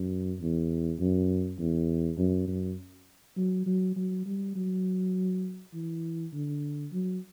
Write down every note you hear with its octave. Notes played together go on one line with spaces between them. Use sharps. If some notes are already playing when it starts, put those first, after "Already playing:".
Already playing: F#2
E2
F#2
E2
F#2
F#2
F#3
F#3
F#3
G3
F#3
E3
D3
F#3